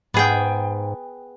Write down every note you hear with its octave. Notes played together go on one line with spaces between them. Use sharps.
G#2 B3 G#4 G5